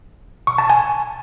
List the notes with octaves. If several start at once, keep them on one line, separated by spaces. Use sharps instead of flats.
C#6
A5
G#5